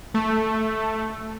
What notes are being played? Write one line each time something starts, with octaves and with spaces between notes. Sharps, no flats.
A3